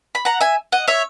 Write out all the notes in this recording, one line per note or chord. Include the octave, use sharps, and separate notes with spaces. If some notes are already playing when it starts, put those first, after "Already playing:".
B5
F#5 A#5
E5 G#5
D#5 F#5
C#5 E5